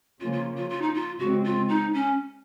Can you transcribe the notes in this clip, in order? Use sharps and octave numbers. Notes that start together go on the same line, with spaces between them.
C#3 F3 A#3 C#4 F4
F4
F4
F4
D#4
F4
C#3 G#3 C4 F#4
F4
D#4
C#4